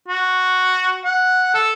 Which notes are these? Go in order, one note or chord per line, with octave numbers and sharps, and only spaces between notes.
F#4
F#5
A4